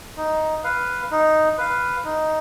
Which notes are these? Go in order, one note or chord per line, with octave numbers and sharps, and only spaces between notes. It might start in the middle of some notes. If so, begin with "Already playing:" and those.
D#4
B4 F5
D#4
B4 F5
D#4